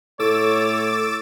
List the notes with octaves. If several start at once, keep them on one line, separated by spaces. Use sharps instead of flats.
A2 A4 C#5 D6 E6 A6